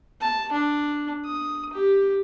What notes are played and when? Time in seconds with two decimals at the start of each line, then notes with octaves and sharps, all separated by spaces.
0.21 A5
0.53 D4
1.25 D#6
1.73 G4